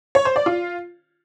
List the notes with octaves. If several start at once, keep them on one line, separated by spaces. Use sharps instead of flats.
C#5
C5
D5
F4